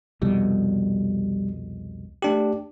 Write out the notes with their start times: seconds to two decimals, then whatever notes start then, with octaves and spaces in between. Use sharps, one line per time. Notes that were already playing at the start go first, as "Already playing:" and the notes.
0.22 C2 F2 B2 G3
2.22 A3 D4 G4